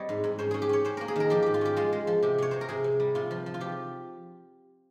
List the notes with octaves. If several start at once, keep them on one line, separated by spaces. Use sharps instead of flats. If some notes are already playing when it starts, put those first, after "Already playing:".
Already playing: G3 C4 C#5 D#5
G#2
G#2
C#4 C5
C#4 G#4
G4
C#4 C#5
C#4 C5
A#3 A#4
G#4
D#3 A#4
F3 G4
G#2 G4
F4
C#4 G4
G#3 F4
G#3
F3
C3 G4
C3 C#5
C3 C5
A#4
C3 G#4
C3
G3
C3 F4
F3
F3
F4
F3 G4